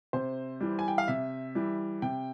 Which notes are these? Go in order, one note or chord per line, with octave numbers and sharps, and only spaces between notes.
C3 C5
E3 G3
G#5
G5
F5
C3 E5
E3 G3
C3 G5